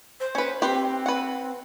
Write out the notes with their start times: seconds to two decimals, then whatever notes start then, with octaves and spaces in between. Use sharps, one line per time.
0.20 C5
0.35 C#4 B4
0.62 C4 G4 B4 C5
1.06 B4 F#5